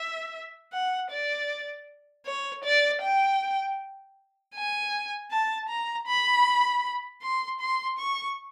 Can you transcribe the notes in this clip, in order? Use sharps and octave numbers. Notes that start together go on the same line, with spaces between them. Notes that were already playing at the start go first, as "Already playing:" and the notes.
Already playing: E5
F#5
D5
C#5
D5
G5
G#5
A5
A#5
B5
C6
C6
C#6